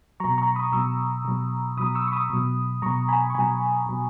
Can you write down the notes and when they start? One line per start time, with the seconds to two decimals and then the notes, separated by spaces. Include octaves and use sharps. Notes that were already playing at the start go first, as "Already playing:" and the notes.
0.20 B2 F#3 A#5 C#6
0.38 A#5 C#6
0.55 B5 D#6
0.72 B2 F#3 C#6 E6
1.25 B2 F#3
1.77 B2 F#3 B5 D#6
1.95 C#6 E6
2.07 C#6
2.12 B5 D#6
2.30 B2 F#3
2.82 B2 F#3 A#5 C#6
3.08 G#5 B5
3.30 C#6
3.34 B2 F#3 G#5 B5
3.86 B2 F#3